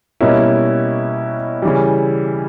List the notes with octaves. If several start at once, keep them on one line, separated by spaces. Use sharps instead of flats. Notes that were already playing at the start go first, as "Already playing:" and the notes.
B2 G3 A#3 C#4 E4
C#3 E3 G3